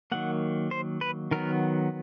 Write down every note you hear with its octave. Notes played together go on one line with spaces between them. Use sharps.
D#3 F#3 A#3 F#5
C5
B4
D#3 F#3 B3 A#4